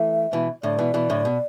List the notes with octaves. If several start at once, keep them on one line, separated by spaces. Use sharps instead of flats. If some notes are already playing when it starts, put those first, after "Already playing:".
Already playing: E3 A3 E5
B2 E3
A2 D3 D5
B2 E3
B2 E3
A2 D3
B2